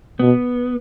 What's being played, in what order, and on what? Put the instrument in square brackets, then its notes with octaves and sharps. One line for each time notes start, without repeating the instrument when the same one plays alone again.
[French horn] B2 [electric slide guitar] B3